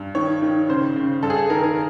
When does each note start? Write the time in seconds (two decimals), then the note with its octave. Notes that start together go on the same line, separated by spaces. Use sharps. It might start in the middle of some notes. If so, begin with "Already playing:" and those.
Already playing: G2
0.15 D#3 C#5
0.42 D#3
0.69 C#3 C5
0.96 C#3
1.23 G2 A4
1.30 G#4
1.36 A4
1.50 D#3 A#4
1.63 A#4